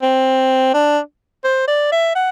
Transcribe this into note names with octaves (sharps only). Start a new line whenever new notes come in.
C4
D4
C5
D5
E5
F#5